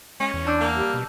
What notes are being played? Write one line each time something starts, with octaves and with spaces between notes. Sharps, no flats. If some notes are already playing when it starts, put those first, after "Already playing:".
G#3 C#4
E2
D4 A5 E6 G6
A#3
G3
B2